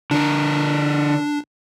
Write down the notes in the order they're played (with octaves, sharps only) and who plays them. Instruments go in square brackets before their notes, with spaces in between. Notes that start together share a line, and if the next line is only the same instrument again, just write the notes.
[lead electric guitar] D3 A#4 [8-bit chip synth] D4